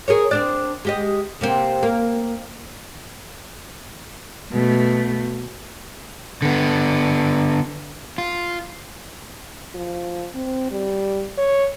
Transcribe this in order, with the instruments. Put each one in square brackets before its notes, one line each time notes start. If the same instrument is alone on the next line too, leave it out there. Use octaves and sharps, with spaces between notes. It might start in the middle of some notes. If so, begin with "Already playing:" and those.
[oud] G#4 A#4 C#5
C4 D4 D5
G#3 G4 D#5
C3 A#3 C4
A#3
[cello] B2 A3
[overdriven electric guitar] D3 B3
F4
[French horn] F3
C4
G3
C#5